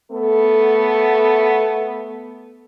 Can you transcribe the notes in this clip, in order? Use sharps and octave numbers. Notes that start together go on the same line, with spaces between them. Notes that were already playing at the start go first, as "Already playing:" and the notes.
A3 B3 A4